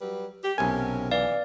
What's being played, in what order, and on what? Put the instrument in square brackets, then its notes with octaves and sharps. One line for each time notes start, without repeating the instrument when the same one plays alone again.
[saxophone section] F#3 G3 B4
G4
[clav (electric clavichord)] B1 G#5 [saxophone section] C3 C#4 A#4
[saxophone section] E3 [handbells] D5 F5